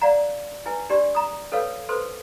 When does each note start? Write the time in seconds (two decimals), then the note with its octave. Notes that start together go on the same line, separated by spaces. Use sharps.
0.01 D5 F5 F#5 A#5
0.66 E4 B4 G#5
0.89 D4 G4 D5 C6
1.15 A#5 D#6
1.52 C#4 A4 B4 C#5 F5 E6
1.89 A4 B4 C5 C6